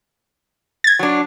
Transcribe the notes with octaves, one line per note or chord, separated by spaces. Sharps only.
G#6 A6
F#3 D4